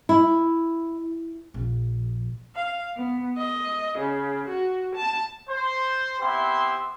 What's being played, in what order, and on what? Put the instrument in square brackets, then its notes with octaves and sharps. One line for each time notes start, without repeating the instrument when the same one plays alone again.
[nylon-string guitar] E4
[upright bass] A#1
[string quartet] F5
B3
D#5
C#3
F#4
A5
[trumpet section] C5
B3 C4 E4 G4 E5 C6